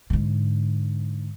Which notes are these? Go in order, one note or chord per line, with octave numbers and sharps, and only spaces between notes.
G#2 D3